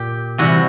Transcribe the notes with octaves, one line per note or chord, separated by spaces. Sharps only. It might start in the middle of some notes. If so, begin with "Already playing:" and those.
Already playing: A#2 G4
C3 E3 G3 F#4